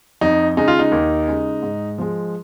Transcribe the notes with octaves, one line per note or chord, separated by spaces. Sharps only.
F2 D#4
C#3 G#3 D#4
F4
D#4
D#2
C#3 G#3
G#2
F3 G#3